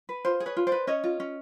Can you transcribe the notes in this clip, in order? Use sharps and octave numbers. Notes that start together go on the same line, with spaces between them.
B4
F4 C5
G#4
B4 C#5
F4
C5 D5
B4
C#4 C#5 D#5
F4
C#4